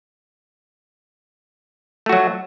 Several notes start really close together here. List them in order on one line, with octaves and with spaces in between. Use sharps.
A3 F#4 F#3